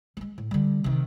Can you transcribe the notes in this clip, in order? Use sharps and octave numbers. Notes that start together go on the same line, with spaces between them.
G3 G#3
A2
D3 G3
C3 D#3